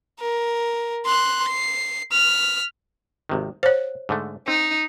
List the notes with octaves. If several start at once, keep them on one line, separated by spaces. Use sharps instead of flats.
A#4
C6 F#6
C7
F6 B6
G#1 C3 D#3
C5 C#5 F5 F#5
G#2 D3 A3
C4 D#4